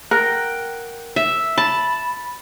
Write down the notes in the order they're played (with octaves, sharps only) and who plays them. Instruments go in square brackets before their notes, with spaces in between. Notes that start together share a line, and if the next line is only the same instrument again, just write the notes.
[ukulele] A#4 [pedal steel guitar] F#5 G5
[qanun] E5
[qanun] A5 [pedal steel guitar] B5